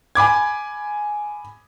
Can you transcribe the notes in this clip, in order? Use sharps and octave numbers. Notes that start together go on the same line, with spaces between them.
G#5 B5 D6 G#6